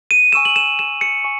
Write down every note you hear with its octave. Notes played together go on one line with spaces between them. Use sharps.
D#7
G#5 C#6 E6 E7
F#7
E7
E7
C#7
G#5 C#6